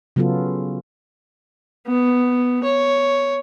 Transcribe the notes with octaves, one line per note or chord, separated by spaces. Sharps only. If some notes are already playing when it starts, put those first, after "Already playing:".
C#3 F#3 B3 C#4 F4 A4
B3
C#5